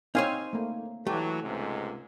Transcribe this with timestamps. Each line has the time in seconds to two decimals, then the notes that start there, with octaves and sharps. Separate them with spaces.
0.15 C4 D#4 C5 C#5 F5 G#5
0.53 A3 A#3
1.07 E3 F#3 A3 G4
1.43 C#2 G#2 C3